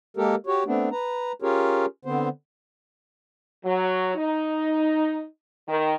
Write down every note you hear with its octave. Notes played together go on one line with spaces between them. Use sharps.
G#3 A#3 G4 A4 A#4
F#4 G4 C#5
A3 B3 C4 D4
B4 A#5
C#4 F4 G4 G#4 A#4 C#5
D3 B3 C4 C5
F#3
D#4
D#3